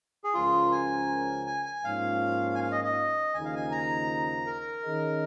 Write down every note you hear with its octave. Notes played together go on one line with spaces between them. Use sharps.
G#4
C#2 C#3 F3 C#4 F4 A#4
G#5
G#5
G#5
G#2 F3 A#3 C#4 F4 F5
G#5
F5
D#5
D#5
D#2 C#3 F3 A#3 D#4 G#5
F5
G#5
A#5
A#4
D#3 C#4 G#4 D#5